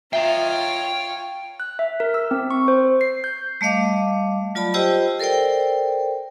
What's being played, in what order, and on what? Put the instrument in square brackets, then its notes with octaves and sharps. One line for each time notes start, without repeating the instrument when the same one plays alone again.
[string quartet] F4 C#5 F5 [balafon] E5 [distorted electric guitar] G5 A#5
[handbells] F#6
E5
A#4
E6
C4
C#6
C5
C7
G6
[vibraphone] G3 A3 D#5 F5 D6
F#3 F4 D5 A5 B5
F4 G4 C5 D#5 G5 E6
A4 A#4 C5 D5 G5